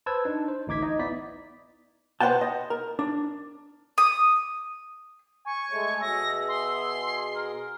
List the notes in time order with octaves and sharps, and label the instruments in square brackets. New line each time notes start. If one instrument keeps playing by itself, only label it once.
[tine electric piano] B4 C5 A5 E6 G#6
D4 D#4
C5
A1 D2 D#4 D6 G#6 B6
D#4 D#5
B3 E4 D5 B6
[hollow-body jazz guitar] B4 C5 D5 F#5 G5 A5
D#5
A#4
D4
[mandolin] D#6
[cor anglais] G#5 [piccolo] C#6
[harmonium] G#3 A3 C#5
[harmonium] B2 G#4 [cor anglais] E5 [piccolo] A#6
[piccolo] C6
[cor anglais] A#4